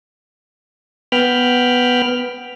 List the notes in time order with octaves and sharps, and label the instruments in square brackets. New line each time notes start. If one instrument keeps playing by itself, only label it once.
[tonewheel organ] B3 G5 B5 F6